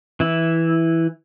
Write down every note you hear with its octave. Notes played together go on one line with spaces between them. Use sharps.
E3 E4